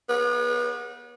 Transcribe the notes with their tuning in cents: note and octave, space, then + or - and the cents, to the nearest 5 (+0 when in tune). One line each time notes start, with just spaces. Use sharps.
B3 -35